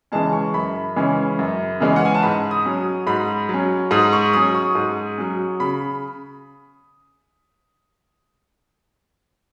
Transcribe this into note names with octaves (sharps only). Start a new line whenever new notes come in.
C#3 E3 G#3 C#4 A5
C#6
F#2 B5
C#3 E3 G#3 C#4
F#2
C#3 E3 G#3 C#4
F#5
G#5
A5
G#2 B5
D#6
F#3 C#4
D#6
G#2 B5
F#3 C#4
G#2 D#6
C#6
F#3 C#4 D#6
C#6
G#2
F#3 C#4
C#3 B5